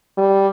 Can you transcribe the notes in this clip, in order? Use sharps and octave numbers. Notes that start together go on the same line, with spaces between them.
G3